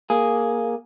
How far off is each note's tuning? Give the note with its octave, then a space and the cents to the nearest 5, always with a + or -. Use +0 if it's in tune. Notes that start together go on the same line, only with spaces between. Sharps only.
A#3 +0 G#4 +0